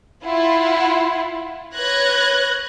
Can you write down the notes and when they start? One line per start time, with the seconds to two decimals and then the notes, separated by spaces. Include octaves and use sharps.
0.25 E4 F4 F#5
1.75 B4 C#5 F#6 G#6 A#6